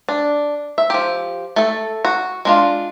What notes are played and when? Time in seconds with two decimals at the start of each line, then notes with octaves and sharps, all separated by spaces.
0.09 D4
0.78 E5
0.90 F3 G4
1.56 A3 A4
2.05 F#4
2.45 G#3 D4 F4